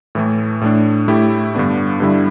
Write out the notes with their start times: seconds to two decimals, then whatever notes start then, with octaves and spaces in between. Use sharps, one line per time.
0.15 A2 E3 A3
0.61 A2 A3 D4
1.08 A2 A3 E4 G4
1.54 G2 D3 B3 D4
2.00 G2 D3 G3 E4